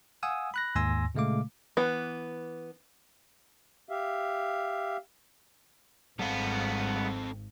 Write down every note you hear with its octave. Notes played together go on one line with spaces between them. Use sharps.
F5 F#5 G#5 D#6 E6
B5 F#6 A#6
D#2 G#2 G#5 C6 E6 A#6
A#2 C#3 G#3 A3 F5 D6
E3 B3
G4 E5 F5
G#1 G3 G#3 B3 C4 A4 F5